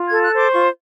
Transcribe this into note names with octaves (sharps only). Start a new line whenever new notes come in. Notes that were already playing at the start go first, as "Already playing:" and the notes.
Already playing: F4
A4 G#6
F#6
C5 D6
F4 C#6